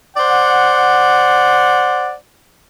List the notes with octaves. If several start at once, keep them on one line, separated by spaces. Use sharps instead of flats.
C5 D5 F#5